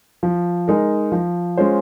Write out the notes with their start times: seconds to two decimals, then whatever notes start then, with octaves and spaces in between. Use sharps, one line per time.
0.23 F3
0.68 G#3 D#4 A#4
1.12 F3
1.57 G#3 C#4 F4 C5